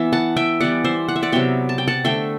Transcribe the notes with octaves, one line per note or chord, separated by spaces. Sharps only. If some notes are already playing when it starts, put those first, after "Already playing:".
Already playing: E3 B3 E5
F#5 A5
E5 G5
E3 G3 B3 D5 F#5
C5 E5
F#5
E5
D5 F#5
C3 F#3 B3 E5 G5
A5
G5
F#5 A5
D3 A3 E5 G5